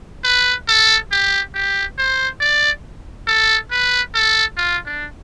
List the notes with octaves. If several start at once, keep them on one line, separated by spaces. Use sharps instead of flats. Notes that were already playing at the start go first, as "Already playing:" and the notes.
B4
A4
G4
G4
C5
D5
A4
B4
A4
F4
D4